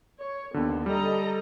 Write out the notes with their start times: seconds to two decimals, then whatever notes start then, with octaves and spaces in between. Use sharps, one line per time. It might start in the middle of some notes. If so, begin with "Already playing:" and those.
0.19 C#5
0.54 D#2 D3 B3
0.86 G3 A4 D#5 A#5